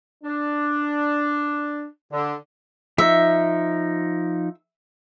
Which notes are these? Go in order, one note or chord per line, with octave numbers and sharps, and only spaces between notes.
D4
D3
F3 D#4 E5